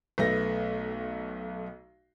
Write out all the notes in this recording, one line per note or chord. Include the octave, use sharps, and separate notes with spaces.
B1 A3 B3 A#6